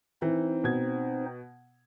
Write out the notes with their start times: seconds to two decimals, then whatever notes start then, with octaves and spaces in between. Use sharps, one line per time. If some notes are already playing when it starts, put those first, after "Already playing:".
0.22 E3 C4 D#4 C5
0.64 B2 G#6